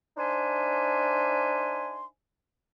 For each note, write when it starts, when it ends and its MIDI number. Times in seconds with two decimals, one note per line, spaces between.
0.17 2.05 62
0.17 2.05 63
0.17 2.05 72
0.17 2.05 76
0.17 2.05 80
0.17 2.05 84